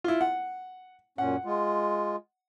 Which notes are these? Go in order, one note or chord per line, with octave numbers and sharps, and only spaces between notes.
E4 F4
F#5
F#2 A#2 C#4 F#5
G#3 F4